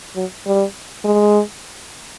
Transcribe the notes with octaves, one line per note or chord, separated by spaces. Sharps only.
F#3
G3
G#3